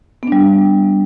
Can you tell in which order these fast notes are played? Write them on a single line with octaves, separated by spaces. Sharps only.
B3 D4 G3